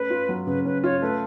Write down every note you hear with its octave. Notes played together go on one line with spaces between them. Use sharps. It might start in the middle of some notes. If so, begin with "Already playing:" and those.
Already playing: A3 C#4 B4
F4
F#3
C#3 B4
C#4 B4
F4 C#5
A3 B4